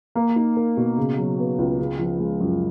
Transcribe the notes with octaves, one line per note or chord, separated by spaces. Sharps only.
A#3
D#4
A#4
B2
C#3
F#3
B3
C#2
C#3
F3
G#3
F#2